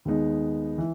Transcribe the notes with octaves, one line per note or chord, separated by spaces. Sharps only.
D#2 D#3 G#3 B3 D#4
E3